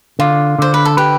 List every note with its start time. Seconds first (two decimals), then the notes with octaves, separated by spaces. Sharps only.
0.19 D3 F4
0.59 D3 C5
0.74 B4
0.85 A4
0.97 G4 B4